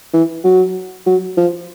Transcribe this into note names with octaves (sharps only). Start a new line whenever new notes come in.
E3
F#3
F#3
F3